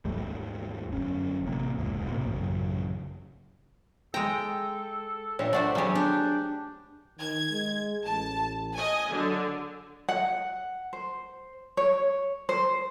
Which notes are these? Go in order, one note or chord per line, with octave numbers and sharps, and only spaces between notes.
D#2 G#2 G3 A3
G1 F#2 C#4
A1 C3 A#3
E1 C#2 G#2
B1 A2 C3 A#3
A1 F#2 C#3
G#3 A4 G5 A#5
A#2 D4 G4 C#5 E5
A3 D4 C5 D5 F#5
F#3 G3 A3 B3 G4 G#4
D4 G5
D#3 G#6
G#3
A1 A5
D#5 G#5
D3 F#3
F#5
C5
C#5
C5